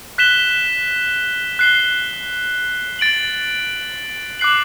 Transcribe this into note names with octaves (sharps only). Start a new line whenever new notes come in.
F#6 B6 E7 G7
F#6 C7 G7
A6 D7 F#7
D6 F#6 C7 F#7